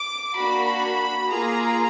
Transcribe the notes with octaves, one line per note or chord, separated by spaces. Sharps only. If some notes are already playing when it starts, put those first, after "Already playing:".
Already playing: D6
A#3 D4 F#4 B5
A#3 F4 G#4 A#5